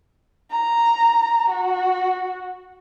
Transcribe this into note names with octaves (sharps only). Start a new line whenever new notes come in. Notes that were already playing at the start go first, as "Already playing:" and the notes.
A#5
F#4